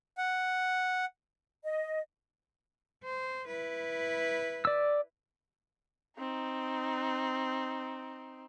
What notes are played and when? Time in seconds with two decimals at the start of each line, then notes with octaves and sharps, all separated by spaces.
0.18 F#5
1.65 D#5
3.04 C5
3.47 E4 B4
4.65 D5 E6
6.18 C4 D#4